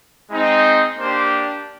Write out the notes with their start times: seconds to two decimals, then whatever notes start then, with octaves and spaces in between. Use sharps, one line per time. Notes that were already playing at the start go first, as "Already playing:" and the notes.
0.31 G#3 C4 D#4
0.98 A#3 D4 G4 C5